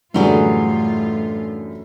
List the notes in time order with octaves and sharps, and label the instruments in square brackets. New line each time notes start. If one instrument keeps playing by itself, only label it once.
[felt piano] F#2 D3 G3 [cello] A2 F4 [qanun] E3 F#3 G#4